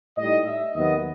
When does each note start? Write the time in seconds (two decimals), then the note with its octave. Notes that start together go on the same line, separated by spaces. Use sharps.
0.17 A2 G3 D#4 D#5
0.46 E5
0.74 D#2 D#3 F#3 B3 D#5